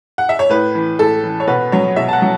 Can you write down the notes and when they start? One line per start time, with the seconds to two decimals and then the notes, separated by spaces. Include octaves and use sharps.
0.18 F#5
0.29 E5
0.39 C#5
0.49 A2 B4
0.75 E3
0.99 A2 A4
1.23 E3
1.40 C#5
1.47 B2 B4
1.72 F#3 C#5
1.96 B2 E5
2.08 A5
2.13 F#5
2.22 F#3